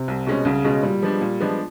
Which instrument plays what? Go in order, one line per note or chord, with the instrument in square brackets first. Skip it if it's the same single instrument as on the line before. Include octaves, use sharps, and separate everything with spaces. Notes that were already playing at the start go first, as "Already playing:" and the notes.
Already playing: [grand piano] C3
[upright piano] C2
B2 G#3 C#4
[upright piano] C2 [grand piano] C#3
[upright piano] B2 G#3 C#4
[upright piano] A#2 [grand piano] G3
[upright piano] F3 G#3 B3 D4
A#2
F3 G#3 B3 D4